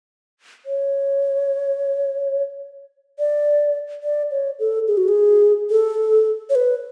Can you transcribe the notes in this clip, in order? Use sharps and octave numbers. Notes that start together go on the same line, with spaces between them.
C#5
D5
D5
C#5
A4
G#4
F#4
G#4
A4
C#5
B4